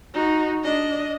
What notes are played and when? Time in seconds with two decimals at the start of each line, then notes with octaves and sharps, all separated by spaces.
0.14 D#4 F#4
0.64 D4 D#5